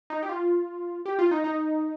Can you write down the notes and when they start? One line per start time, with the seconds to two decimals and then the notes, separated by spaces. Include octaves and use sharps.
0.10 D#4
0.23 G4
0.29 F4
1.05 G4
1.19 F4
1.31 D#4
1.44 D#4